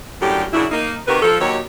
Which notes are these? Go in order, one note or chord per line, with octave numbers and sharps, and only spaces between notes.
F#2 A2 D3 G3 G4
F#2 C#3 F#3 D4 E4
A#3 D#4
C3 D#3 F#4 G4 A#4 B4
F3 A4
D#2 F#3 D#4 G4 C#5